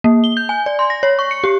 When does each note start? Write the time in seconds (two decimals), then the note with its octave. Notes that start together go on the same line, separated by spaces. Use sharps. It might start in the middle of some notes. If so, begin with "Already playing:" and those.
0.04 A#3
0.24 G7
0.37 G6
0.49 G#5
0.66 D5
0.79 C6
0.90 A#6
1.03 C#5
1.19 C#6
1.31 C#7
1.44 G4